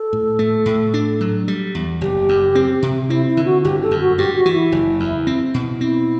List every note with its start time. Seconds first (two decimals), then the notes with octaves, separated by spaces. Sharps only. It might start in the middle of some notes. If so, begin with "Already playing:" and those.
Already playing: A4
0.13 A2
0.39 A3
0.66 A2
0.94 D4
1.21 F#3
1.48 G3
1.75 E2
2.01 F#1 G4
2.29 F#2
2.55 C4
2.82 C3
3.09 C4 E4
3.28 E4
3.37 D3
3.45 F#4
3.64 G1 G4
3.83 A4
3.91 F#2
4.01 F#4
4.18 G2 G4
4.37 F#4
4.46 E3
4.54 E4
4.72 F#1
5.00 E2
5.27 C4
5.54 B2
5.81 C4 E4